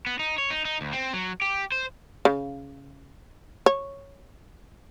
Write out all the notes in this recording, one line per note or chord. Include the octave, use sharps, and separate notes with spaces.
B3
D#4
C#5
D#4
D#4
D2
C4
F#3
G4
C5
C#3
C#5